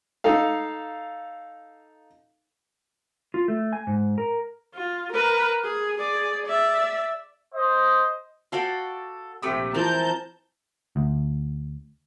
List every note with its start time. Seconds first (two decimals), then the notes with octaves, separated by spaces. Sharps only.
0.24 D#4 A4 F5
3.34 F4
3.48 A3
3.73 G#5
3.87 G#2
4.18 A#4
4.74 F4
5.12 A#4 B4
5.63 G#4
5.98 G#4 D5
6.46 D5 E5
7.55 C5 D#5
8.52 F#4 A4 D5 F5 G5 F6
9.43 A#1 C3 A3 G4 E6
9.74 E3 F3 C4 A#4 A5 A#5 G6
10.96 D2